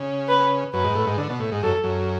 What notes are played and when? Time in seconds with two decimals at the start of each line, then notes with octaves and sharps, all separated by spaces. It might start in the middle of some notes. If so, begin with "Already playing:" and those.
Already playing: C#3
0.28 B4
0.74 F#2 B4
0.84 G#2
0.95 A2
1.07 G#2
1.18 D3
1.29 B2
1.40 A2
1.52 G#2
1.63 F#2 A4
1.84 F#2